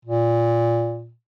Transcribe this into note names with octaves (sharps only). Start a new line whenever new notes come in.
A#2